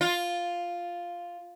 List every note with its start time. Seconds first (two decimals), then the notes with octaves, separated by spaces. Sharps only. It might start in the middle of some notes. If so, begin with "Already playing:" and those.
0.01 F4